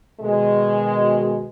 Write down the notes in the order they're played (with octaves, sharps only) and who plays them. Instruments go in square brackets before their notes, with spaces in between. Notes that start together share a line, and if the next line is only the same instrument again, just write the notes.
[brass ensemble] B2 D#3 G#3